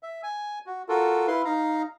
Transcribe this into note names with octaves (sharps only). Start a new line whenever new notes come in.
E5
G#5
F#4
F4 F#4 A4 A#4
E4 B4 F5 C6
D#4 F5 A#5